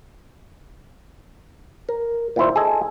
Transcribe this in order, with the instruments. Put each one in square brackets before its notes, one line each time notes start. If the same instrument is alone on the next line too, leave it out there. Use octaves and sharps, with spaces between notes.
[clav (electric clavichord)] A#4
A#2 D#3 E4 C5
G#4 A4 D#5 G#5